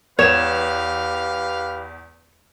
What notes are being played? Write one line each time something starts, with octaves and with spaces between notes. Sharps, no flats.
E2 G4 B4 C#5 F5 E7